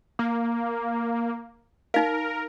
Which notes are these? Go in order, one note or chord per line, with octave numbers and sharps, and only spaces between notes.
A#3
D#4 A#4 F5